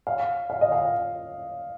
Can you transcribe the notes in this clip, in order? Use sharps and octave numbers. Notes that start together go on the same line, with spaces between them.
F5
F5
D#5
F5